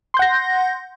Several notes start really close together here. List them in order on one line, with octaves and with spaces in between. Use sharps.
C6 G6 F#5 A#6